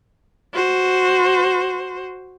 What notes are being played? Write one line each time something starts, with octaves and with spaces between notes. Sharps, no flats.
F#4 C5